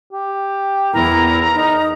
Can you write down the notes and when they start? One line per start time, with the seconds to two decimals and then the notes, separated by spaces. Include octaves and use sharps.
0.13 G4
0.94 E2 E4 A#4 A#5
1.55 D#4